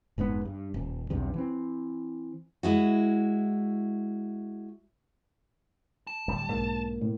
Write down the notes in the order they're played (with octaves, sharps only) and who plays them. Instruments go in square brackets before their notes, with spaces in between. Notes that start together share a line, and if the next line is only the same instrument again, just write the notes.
[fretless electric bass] F1 G#2 C3 B3
G2
D#1
B1 E2 G2 C3
E3 C4
[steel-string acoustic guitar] G#3 E4 F#4
[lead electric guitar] A5
[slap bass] D1 G3
[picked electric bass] B1 G#2 [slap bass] A#3
[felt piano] A2